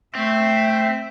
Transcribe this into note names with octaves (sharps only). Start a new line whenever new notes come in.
A3 C4 E5